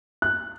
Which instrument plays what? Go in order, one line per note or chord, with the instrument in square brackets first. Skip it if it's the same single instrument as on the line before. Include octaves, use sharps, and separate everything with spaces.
[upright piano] F#6